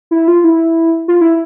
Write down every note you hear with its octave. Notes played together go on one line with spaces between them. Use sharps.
E4
F4
E4
F4
E4